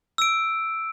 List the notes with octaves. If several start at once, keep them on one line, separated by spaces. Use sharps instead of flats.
E6 D7